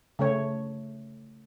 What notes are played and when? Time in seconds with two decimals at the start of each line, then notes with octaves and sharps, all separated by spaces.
0.19 C#3 A3 C#5